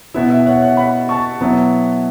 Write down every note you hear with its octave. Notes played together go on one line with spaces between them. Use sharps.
B2 B3 E4 E5
E5
C#5 F#5
C#5 F#5
F#5 B5
A5 C#6
B2 F#3 B3 E4